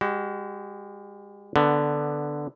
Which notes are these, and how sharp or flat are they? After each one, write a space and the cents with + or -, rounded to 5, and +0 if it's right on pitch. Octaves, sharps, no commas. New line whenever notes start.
G#3 -40 F#4 +40
D3 +0 B3 +0